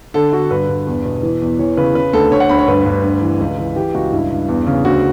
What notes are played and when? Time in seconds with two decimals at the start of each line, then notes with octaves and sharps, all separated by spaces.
0.14 D3 A4
0.32 D3 F#4
0.51 G2 B4
0.69 G2
0.87 E2
1.05 B2
1.23 E3
1.42 E2
1.59 E3 C#5
1.77 C#3 B4
1.95 C#3 B4
2.13 D2 A4
2.31 D2 C#5
2.40 F#5
2.49 D2 B5
2.59 C#5
2.68 G2 B4
2.86 G2
3.04 D2
3.22 E3
3.40 C#2
3.58 E3
3.76 E3 G4
3.94 C#2 F#4
4.12 G2 E4
4.30 G2
4.48 E2
4.67 C#3
4.85 D2 F#4